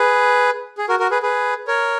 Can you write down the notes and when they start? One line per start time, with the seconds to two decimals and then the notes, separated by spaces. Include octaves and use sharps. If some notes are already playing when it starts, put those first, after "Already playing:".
Already playing: G#4 B4
0.78 G#4
0.89 F#4 A#4
0.99 F#4 A#4
1.11 G#4 B4
1.22 G#4 B4
1.67 A#4 C#5